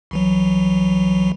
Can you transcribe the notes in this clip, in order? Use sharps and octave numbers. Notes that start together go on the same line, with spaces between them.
C2 E3 F#3